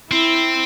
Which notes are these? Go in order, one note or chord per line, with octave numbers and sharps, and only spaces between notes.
C4 E4